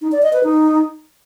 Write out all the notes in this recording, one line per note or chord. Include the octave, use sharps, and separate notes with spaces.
D#4
D5
D#5
B4
D#4